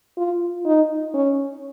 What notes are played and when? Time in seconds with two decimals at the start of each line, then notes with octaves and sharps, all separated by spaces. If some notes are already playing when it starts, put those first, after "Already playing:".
0.17 F4
0.66 D#4
1.14 C#4